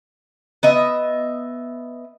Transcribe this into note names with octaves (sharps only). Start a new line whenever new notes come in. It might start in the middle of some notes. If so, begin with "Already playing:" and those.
B3 D#5 E5